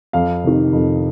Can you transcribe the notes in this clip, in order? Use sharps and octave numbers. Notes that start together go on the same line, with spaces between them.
F2 F5
C3 D#3
F2